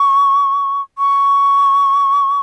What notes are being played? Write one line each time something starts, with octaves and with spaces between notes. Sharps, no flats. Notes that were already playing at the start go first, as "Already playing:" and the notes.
Already playing: C#6
C#6